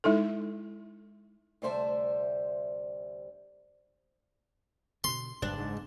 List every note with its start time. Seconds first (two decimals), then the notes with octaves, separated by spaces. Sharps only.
0.04 G#3 D#4 E4 A4
1.62 D2 C3 G3 C5 E5 A5
5.04 B2 D3 C6
5.42 F#1 G2 D4
5.57 G#2